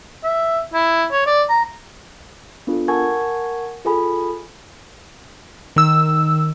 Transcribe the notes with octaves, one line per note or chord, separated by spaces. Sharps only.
E5
E4
C#5
D5
A#5
B3 D4 F4 A4
A#4 F#5 G#5 A5 C#6 G#6
F4 G#4 A4 G#5 B5
D#3 E6